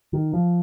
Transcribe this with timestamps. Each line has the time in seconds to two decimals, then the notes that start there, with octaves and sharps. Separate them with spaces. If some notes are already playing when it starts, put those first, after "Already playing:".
0.13 D#3
0.33 F3